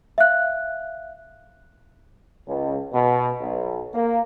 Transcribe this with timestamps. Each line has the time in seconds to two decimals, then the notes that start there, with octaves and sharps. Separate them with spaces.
0.18 E5 F5 F#6
2.48 C#2
2.93 B2
3.40 B1
3.93 A#3